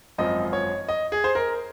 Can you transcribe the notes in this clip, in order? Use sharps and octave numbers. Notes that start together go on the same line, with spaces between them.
G#1 F#2 F3 D#5
C#5
D#5
G#4
C5
A#4